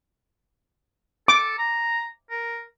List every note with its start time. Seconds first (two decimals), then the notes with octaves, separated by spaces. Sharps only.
1.28 A4 D6
1.59 A#5
2.30 A#4